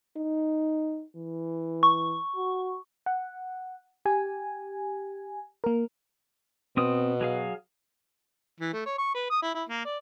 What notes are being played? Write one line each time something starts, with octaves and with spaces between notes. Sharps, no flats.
D#4
E3
C#6
F#4
F#5
G4 G#5
A#3 A#4
B2 C4 D#6
F#3 G#4 F5
E3
A3
C#5
C#6
B4
D#6
E4
E4
A#3
D5